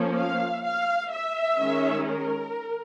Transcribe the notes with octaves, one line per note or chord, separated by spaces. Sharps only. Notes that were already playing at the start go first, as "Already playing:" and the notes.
Already playing: F3 A#3 C#4
F5
F5
E5
D#3 G#3 C#4
A#4